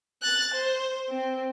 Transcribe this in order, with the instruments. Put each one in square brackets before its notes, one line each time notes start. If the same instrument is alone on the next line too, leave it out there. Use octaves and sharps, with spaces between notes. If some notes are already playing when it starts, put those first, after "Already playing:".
[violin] F#6 A6
C5
C4